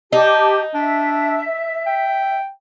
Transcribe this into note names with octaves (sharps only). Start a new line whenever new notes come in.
D#4 G4 A5
D4 E5
G5